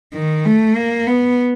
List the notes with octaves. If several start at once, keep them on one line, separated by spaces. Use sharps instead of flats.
D#3
A3
A#3
B3